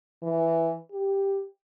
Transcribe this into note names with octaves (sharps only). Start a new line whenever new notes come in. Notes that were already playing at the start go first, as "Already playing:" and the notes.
E3
G4